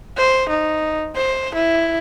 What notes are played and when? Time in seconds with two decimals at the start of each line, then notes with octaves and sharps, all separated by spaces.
0.17 C5
0.49 D#4
1.16 C5
1.55 E4